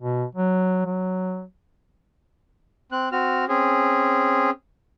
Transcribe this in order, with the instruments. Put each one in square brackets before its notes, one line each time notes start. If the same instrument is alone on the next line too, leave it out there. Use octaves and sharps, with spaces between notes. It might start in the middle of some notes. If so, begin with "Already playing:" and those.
[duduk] B2
F#3
F#3
[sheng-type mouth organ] C4 F#6
C4 F#4 F6
C4 C#4 G#4